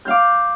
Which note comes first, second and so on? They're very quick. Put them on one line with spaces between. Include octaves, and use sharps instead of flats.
G6 F5 D6